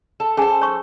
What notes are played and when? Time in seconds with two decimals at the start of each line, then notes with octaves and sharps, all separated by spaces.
0.20 A4
0.37 C#4 G#4 A4 C5 G#5
0.62 C#5 C#6